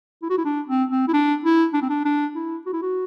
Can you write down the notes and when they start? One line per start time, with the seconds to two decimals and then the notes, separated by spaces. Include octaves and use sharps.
0.23 E4
0.30 F#4
0.38 E4
0.45 D4
0.68 C4
0.90 C4
1.08 E4
1.13 D4
1.44 E4
1.74 D4
1.82 C4
1.90 D4
2.05 D4
2.36 E4
2.66 F#4
2.73 E4
2.82 F#4